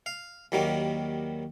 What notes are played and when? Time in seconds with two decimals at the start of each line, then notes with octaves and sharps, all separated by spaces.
0.06 F5
0.52 D#2 D#3 F#3 G3 A#3